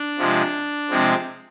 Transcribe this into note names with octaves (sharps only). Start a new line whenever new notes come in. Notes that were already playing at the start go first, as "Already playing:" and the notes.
Already playing: D4
C3 F3 G#3
C3 F3 G#3 C4